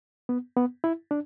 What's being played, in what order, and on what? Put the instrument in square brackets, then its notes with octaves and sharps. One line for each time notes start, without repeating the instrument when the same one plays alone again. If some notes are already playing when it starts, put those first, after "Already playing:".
[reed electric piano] B3
B3
E4
D4